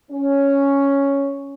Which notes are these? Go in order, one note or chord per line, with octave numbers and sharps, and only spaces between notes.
C#4